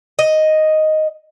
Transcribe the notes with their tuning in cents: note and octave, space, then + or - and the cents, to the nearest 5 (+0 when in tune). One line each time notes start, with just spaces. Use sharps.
D#5 +0